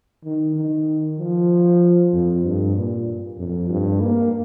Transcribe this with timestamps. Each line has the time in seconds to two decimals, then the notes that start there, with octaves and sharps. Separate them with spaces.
0.24 D#3
0.56 D#3
1.18 F3
2.13 F2
2.44 G2
2.76 A#2
3.38 F2
3.70 G2
4.01 A#3